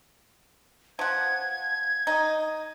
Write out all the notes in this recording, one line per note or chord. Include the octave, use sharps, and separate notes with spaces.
F3 F#5 G#6
D#4